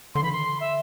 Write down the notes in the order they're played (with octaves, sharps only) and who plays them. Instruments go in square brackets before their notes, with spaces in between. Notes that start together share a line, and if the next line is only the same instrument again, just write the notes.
[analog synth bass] D3 [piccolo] C6
[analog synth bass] E3 [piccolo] B5
[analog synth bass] D3 [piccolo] C6
[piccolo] E5